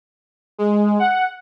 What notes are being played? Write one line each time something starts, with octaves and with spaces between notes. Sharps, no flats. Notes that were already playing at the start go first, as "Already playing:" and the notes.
G#3
F#5